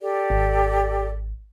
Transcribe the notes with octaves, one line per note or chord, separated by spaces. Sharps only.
G4 A4 D5
G#1